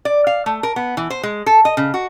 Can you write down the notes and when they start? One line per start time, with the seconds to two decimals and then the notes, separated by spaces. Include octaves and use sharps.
0.05 D5
0.27 F5
0.46 A3
0.63 A#4
0.76 B3
0.97 E3
1.10 C5
1.23 G#3
1.46 A4
1.65 D#5
1.77 C#3
1.94 F#4